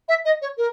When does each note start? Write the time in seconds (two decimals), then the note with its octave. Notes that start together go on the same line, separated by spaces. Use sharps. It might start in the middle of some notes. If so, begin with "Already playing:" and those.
0.09 E5
0.25 D#5
0.42 C#5
0.57 A#4